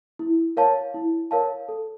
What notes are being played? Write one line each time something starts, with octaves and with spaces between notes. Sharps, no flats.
E4
A#4 C#5 F5 A5
E4
A#4 C#5 F5 A5
A4